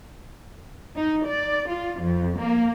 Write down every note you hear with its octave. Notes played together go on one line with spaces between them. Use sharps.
D#4
D5
F4
F2
A#3